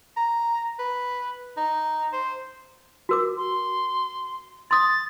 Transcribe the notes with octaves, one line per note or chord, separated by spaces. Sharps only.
A#5
B4
D#4
C5
F#4 A#4 D6
C6
C6 D#6 A6